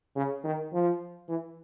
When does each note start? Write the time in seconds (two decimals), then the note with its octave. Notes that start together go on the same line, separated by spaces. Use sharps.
0.16 C#3
0.44 D#3
0.73 F3
1.29 E3